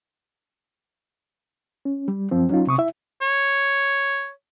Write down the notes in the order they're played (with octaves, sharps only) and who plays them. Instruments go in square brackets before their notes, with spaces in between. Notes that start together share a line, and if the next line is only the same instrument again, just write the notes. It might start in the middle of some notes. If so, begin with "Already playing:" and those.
[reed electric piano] C#4
G3
F#2 F3 C4
F#3 C#4 D#4 F4
C3 C#6 D#6
E4 E5
[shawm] C#5